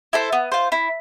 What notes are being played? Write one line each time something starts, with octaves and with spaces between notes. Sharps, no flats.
E4 A4 C5
B3
F4 C5
E4